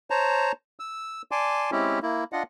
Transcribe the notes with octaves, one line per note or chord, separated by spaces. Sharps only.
C5 C#5 A5 A#5
E6
D5 G#5 A5 C6 D6
G#3 C4 C#4 E4 G4
A#3 E4
D4 F4 D#5 F#5